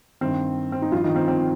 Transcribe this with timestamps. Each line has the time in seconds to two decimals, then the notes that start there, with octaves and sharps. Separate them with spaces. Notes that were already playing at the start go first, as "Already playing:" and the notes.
0.21 G2 D#3 C4
0.72 C4
0.82 D#4
0.92 G2 F3 F4
1.04 D#3 D#4
1.16 C4
1.28 C4